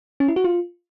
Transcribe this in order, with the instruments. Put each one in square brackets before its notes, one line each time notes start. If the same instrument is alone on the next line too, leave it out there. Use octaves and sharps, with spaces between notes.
[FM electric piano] C#4
E4
F#4
F4